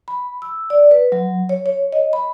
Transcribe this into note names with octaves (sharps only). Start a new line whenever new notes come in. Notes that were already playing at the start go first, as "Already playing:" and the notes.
B5
E6
D5
B4
F#3
C#5
C#5
D#5
B5